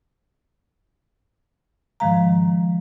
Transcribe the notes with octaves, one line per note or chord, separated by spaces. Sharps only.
G#2 D#3 F3 G#3 F5 A#5